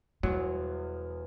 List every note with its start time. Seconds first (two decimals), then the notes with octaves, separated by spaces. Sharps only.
0.23 E1 E2 F#3 G3 E4